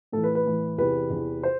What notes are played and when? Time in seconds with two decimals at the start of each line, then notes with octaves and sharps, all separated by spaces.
0.12 A2 E3 A4
0.24 B4
0.35 B4
0.46 A2 E3
0.78 E2 C3 E3 B4
1.10 E2 C3 E3
1.43 C5